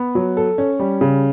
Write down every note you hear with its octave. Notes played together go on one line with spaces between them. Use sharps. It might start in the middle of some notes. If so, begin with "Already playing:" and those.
Already playing: B3
F#3
A4
C#4
G3
C#3